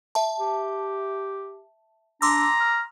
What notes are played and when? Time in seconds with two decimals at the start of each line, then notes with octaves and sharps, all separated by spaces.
0.15 E5 A5
0.40 G4
2.22 D4 A#5 C6 D6 E6
2.60 F6